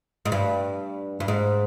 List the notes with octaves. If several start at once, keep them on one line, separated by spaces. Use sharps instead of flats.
G#2
G2
G2
G#2